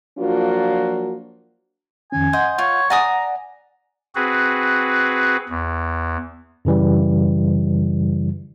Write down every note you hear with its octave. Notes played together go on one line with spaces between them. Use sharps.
F3 F#3 A#3 D4 F4 F#4
F2 D#3 C#4 G#5
D#5 F#5 C6 G6
F4 C#5
D5 F#5 G#5 A#5 D#6
C4 F#4 G#4 B4
E2
F#2 C#3 E3 G3